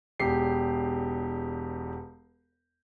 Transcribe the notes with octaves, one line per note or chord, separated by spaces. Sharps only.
E1 E2 G4 C7